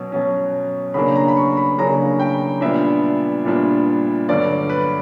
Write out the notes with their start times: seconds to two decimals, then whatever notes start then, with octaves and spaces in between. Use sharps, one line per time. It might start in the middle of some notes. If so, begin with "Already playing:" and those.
Already playing: B2 F#3 C#4
0.12 B2 F#3 C#4
0.94 C#3 F#3 A#3 D4 B5
1.16 A#5
1.28 B5
1.37 C#6
1.57 B5
1.78 C#3 F#3 A#3 D4 A#5
2.20 G5
2.61 A#2 G3 B3 D4 E5
3.45 A#2 G3 B3 D4
4.28 G2 D3 F#3 D5
4.69 B4